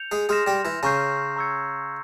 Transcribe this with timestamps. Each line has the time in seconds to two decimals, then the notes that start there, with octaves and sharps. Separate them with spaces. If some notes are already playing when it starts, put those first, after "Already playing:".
Already playing: G6 C#7 F7
0.11 G#3 G#4
0.29 G#3 G#4 C6 F6 A#6 E7
0.47 G3 G4
0.65 E3 E4
0.83 C#3 C#4 A#5 C#6 E6 G6 C7
1.36 A#5 C#6 E6 G#6 C#7